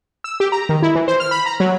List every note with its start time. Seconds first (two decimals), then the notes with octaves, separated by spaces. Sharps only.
0.24 E6
0.40 G4
0.52 A#5
0.69 D#3
0.83 E4
0.95 E3
1.08 C5
1.20 F6
1.31 B5
1.46 A#5
1.60 F#3